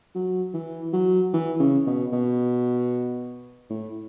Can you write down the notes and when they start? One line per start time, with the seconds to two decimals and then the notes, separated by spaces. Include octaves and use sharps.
0.15 F#3
0.54 E3
0.93 F#3
1.33 E3
1.60 C#3
1.87 B2
2.13 B2
3.70 A2